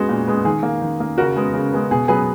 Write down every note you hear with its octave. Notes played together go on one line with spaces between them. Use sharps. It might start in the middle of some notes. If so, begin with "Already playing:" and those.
Already playing: G#3 B3 F#4
A#2
G#3 B3
D#3 G#4
A#3
D#3
A#3
C#3 F#4 A#4
G#3 B3
C#3
G#3 B3
B2 G#4
F#3 B3 G#4 B4